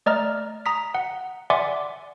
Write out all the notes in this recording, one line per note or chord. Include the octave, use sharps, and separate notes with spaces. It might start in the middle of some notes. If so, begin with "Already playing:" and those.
A3 D5 D#5 A#5 F6
A#5 D#6 B6
F#5
D5 E5 F#5 G#5 C6 D6